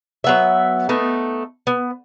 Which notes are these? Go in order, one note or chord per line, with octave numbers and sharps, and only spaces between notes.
F#3 B3 E5
A3 B3 D#4
B3